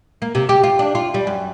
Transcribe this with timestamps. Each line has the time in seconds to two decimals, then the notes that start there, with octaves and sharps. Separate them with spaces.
0.22 A#3
0.35 C3
0.49 G4
0.63 F4
0.79 D4
0.95 F4
1.14 G3
1.27 F#2